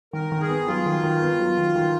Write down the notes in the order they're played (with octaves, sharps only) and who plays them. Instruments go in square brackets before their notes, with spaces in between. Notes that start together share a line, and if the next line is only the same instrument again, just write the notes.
[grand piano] D#3 [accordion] A#4
[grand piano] D#3
[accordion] G#4
[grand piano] B3
[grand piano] F#3 [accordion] F4
[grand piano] D#3
D#3
B3
F#3
D#3
D#3